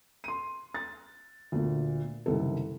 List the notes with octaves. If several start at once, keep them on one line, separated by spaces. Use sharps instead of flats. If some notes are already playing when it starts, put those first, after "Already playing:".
C6 D#7
A6
D2 A#2
F#1 C2 D#3 A4